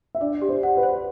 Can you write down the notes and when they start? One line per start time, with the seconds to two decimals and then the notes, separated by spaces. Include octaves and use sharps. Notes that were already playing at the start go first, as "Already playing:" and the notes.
0.15 E5
0.21 D4 D5
0.42 G4
0.49 C5
0.63 F#5
0.77 B4
0.83 C5